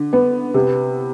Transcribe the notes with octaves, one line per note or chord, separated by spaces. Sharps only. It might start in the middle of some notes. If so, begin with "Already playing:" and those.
Already playing: D3
B3
C3